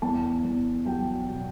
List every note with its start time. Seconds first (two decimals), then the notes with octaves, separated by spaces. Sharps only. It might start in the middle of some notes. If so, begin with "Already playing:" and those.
0.02 E2 A5
0.44 E2
0.86 F#3 G5
1.29 B2